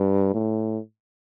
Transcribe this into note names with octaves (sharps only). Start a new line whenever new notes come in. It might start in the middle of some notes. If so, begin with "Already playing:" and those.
Already playing: G2
A2